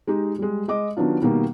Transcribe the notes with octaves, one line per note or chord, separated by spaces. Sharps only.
G#3 D#4 G4
G3 G#3
G#3 D#5 D6
D#3 F#3 B3 D4 F4
B2 D#3 G3 A#3